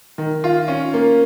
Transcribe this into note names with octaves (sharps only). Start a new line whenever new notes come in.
D#3
F4
C#4
A#3